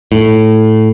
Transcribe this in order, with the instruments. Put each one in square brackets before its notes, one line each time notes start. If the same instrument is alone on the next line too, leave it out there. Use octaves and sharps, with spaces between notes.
[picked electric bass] A2